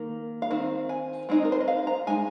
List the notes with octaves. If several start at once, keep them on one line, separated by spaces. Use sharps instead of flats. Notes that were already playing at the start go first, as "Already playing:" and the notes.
Already playing: D#3 A#3
F5
D#3 C4
G#5
G#3 C4 D#4
A#4
C5
D#5
F5
A#5
G#3 D#4 G#5